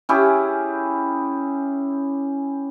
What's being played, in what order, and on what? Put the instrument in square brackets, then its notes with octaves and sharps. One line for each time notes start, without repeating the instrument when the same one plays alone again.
[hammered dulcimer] C#4 E4 G4 G#4